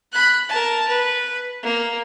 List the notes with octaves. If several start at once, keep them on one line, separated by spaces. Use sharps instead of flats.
B5 F#6
A#4 A5
B4
A#3